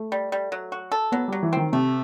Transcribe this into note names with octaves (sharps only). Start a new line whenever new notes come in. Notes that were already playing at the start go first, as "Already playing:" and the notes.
Already playing: A3
G3
G3
F#3
F#4
A4
F#3 B3
F#3 G3
E3
D#3 C4
C3 A3